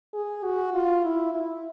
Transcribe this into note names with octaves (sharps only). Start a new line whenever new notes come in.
G#4
F#4
F4
E4
E4